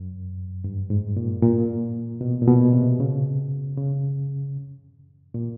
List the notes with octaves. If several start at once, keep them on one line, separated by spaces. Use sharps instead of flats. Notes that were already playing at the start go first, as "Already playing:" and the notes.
Already playing: F#2
G2
G#2
A#2
A#2
B2
A#2
B2
C3
C#3
C#3
A#2